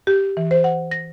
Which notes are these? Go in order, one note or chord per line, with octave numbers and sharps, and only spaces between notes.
G4
E3
C5
F#5
A#6